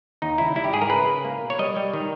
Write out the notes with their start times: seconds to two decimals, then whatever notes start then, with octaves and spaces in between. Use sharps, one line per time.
0.22 D#2 D#4
0.38 C#3 E4
0.55 G3 E4
0.64 G4
0.73 G#2 G#4
0.81 A#4
0.90 C#3 B4
1.08 C#3
1.25 A#3
1.42 B2
1.50 C#5
1.59 G3 D#5
1.76 G3
1.93 D#3